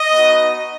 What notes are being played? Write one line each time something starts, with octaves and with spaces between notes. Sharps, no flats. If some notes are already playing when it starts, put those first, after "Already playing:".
Already playing: D#5
B3 D#4 F#4